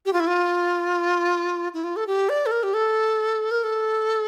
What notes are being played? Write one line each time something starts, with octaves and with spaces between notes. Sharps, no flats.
G4
F4
E4
F4
E4
F4
A4
G4
D5
A4
A#4
G4
A4
A#4
A4